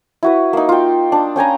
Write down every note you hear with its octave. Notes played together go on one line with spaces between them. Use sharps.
E4 F#4 B4
A#3 D#4
F4 G5
D4
C#4 G5 G#5 A#5